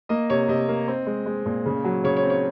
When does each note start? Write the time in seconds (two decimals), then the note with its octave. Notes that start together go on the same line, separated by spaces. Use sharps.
0.09 A#3 D#5
0.30 C3 C#5
0.48 C3 D#5
0.68 A#3
0.88 C4
1.07 G#3
1.26 G#3
1.46 A#2
1.66 C#3
1.84 F#3
2.04 C#3 C#5
2.16 C#5
2.23 C4
2.30 C#5